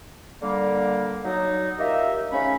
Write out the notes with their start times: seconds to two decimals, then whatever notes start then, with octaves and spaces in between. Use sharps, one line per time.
0.41 D3 G3 A#3
1.25 F#3 D#4
1.78 D#4 F4 G4 A#4 E5
2.32 C#3 F3 A3 C#4 D#4 B5